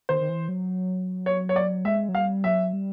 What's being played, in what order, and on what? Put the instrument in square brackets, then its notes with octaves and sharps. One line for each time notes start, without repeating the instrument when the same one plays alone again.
[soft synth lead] D#3 [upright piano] C5
[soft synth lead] D#3
E3
F#3
[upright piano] C#5
C#5
D5
[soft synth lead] G#3 [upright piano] E5
[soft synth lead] F#3
[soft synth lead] G3 [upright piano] F5
[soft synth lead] F#3 [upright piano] E5
[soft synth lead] G3